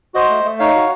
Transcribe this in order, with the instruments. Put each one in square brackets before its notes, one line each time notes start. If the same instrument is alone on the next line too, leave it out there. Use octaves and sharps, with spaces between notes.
[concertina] F#4 C5 D#5
A3
A3
D#4 C#5 F5
F#4